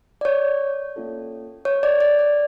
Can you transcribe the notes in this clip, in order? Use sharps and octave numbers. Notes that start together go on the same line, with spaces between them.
D5
C#5
A#3 C#4 F4 A4
C#5
D5
D5
D5